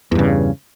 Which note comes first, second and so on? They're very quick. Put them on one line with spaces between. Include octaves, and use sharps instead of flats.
E2 G2 C#3